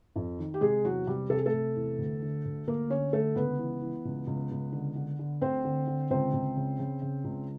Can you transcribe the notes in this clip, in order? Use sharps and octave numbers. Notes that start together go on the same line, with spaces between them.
F2
D#3
G4
C3 G#3 G#4
E2 F#3 F#4
C3 G3 G4
C3 A4
G#4
A3 A4
C3
E2
D2
D3
D2
D2 A#3 A#4
D3 C#4 C#5
D3 A3 A4
C#2 B3 B4
E3
E3
C#2
C#2
C#2
D3
D3
D3
D2 C4 C5
D3
D3
C#2 C4 C5
C#2
C#3
C#3
C#3
C#2